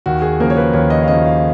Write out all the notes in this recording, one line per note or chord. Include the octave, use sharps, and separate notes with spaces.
D#2 F#4
G#4
C#3 F3 A#3 A#4
C#5
B4
D#2 C#5
D#5
F5
C#3 F3 A#3 D#5
F5
F5